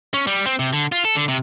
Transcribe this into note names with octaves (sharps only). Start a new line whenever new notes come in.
C#4
G3
C4
C3
D3
F4
A4
D3
C3